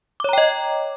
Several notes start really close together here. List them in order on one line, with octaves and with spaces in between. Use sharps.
D6 C#5 A#5 G5 D#5